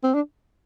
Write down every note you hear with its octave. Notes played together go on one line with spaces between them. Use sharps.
C4
D4